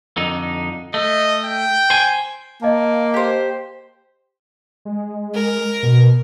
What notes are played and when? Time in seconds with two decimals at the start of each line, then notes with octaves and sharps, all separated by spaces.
0.17 F2 D3 D#4
0.94 A3 D#5
1.45 G5
1.90 C5 G#5
2.62 A#3 D#5 F5 A5
3.14 G4 C5
4.85 G#3
5.34 A#4
5.83 B2